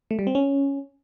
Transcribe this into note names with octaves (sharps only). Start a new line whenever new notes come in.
A3
G3
C4
C#4